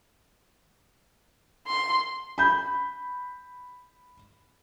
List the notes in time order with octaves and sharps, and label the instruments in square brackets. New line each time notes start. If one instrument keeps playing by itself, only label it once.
[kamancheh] C6
[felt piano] B5 G6